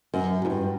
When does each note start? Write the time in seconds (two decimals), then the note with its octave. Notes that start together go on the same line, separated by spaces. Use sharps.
0.14 F#2
0.45 G#2
0.50 G2